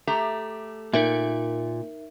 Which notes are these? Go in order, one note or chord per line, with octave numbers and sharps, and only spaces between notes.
A3 G4 A#5
A#2 D#4 A#4 E5